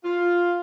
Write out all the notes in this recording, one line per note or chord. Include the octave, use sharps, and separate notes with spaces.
F4